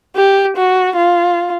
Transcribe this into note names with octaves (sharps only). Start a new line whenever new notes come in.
G4
F#4
F4